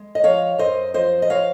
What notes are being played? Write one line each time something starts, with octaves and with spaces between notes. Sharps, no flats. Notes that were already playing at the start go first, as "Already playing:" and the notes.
Already playing: G#3
D#5
F3 C#5 F5
F#2 C5 D#5
F3 C5 D#5
D#5
C#5 F5